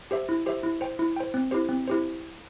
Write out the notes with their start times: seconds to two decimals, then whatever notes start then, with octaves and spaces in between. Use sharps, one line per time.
0.11 G4 C5 E5
0.29 E4
0.46 G4 C5 E5
0.63 E4
0.81 C5 G5
0.99 E4
1.16 C5 G5
1.34 C4
1.51 E4 G4 C5
1.69 C4
1.88 E4 G4 C5